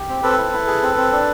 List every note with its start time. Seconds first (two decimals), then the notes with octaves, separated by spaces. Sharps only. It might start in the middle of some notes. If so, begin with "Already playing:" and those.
Already playing: G4
0.09 C4
0.23 C4 A4 B4
0.38 E4
0.53 E4
0.67 G#4
0.82 C4
0.97 C4
1.12 D4